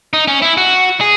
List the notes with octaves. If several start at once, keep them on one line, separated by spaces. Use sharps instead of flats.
D#4
C#4
E4
F#4
G#4